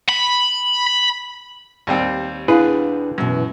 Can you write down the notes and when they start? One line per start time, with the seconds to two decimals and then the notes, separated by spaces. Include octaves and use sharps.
0.09 B5
1.87 D#2 G3 C4
2.48 B3 D4 E4 G#4 B4 F5
3.18 F#2 B2 E3